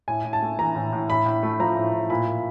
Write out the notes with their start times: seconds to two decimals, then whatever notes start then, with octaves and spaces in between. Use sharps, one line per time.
0.08 A2 G#5
0.25 A2
0.33 A5
0.42 A3
0.59 E3 A#5
0.76 A2
0.92 A2
1.09 A2 B5
1.26 A2
1.43 A3
1.60 F3 A#5
1.76 A2
1.93 A2
2.10 A#2 B5
2.27 A#2